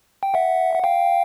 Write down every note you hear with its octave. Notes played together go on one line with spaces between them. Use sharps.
G5
E5 F#5
F#5
F5 G5